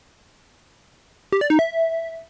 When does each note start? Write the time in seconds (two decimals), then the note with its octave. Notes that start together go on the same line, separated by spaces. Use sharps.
1.32 G4
1.41 D5
1.50 D#4
1.59 E5